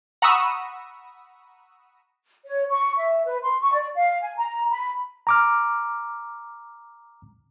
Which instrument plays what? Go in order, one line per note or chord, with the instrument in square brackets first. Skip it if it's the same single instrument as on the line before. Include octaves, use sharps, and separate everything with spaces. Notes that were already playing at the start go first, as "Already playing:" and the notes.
[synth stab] F#5 A#5 B5 C#6 D#6 E6
[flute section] C#5
C#6
E5
B4
C6
C#6
D5
F5
G#5
A#5
B5
[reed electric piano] A#5 D6 F6